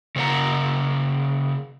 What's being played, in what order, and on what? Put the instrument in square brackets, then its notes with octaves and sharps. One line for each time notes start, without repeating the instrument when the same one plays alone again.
[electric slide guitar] C#3 A#3 C5 F#5 A#5